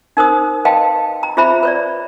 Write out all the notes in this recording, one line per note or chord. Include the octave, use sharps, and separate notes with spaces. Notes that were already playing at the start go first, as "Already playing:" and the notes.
D#4 A#4 C5 D#6
B4 D#5 F5 G5 A5 C6
A#5
F4 G#4 C5 E5 A#5 B5
B4 C#5 D5